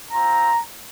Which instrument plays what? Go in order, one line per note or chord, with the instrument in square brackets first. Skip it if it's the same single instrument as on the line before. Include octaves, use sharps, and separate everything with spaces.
[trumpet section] C4 F4 A#5